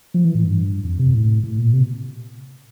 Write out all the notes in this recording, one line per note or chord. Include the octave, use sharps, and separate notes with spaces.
F3
E3
A2
G2
F2
C3
A2
A2
A#2
C3